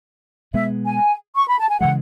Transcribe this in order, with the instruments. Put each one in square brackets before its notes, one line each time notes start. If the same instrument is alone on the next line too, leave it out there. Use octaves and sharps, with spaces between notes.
[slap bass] B2 G#3 B3 [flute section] E5
[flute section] G#5
C#6
B5
A5
G#5
[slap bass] C#3 E3 G#3 [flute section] F#5